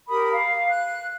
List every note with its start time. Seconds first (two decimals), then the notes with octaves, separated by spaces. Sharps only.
0.08 G4 A#4 B5 D#6
0.34 F5
0.68 F#6